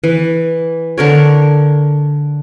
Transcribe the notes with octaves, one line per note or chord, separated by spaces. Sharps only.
E3
D3 A#4 C#5